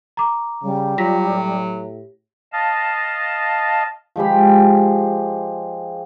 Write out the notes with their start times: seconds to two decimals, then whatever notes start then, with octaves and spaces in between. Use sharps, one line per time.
0.17 A#5 D6
0.64 C#3 G3
0.98 F#3 F4 G4 A#6 B6
1.28 A2
2.53 D#5 F5 A5
4.16 F3 G#3 G4 B5